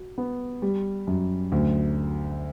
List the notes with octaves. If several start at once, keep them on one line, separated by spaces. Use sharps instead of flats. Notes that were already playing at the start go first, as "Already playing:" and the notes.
Already playing: F#4
B3
G3
F#2
D2